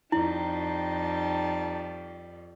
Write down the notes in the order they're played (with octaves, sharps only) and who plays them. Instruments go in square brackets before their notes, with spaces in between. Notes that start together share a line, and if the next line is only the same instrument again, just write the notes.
[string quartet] F2 G3 [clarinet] D#4 [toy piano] E4 [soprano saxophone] A5